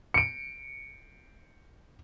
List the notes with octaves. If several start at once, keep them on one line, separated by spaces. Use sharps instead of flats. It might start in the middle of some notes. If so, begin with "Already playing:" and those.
C#7 D7